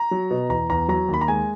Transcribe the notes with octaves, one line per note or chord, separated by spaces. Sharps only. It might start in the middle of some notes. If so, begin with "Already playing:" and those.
Already playing: A#5
F#3
B2
E2 A#5
E2 A#5
F#3 A#5
D#2
B5
A#5
G#3 G#5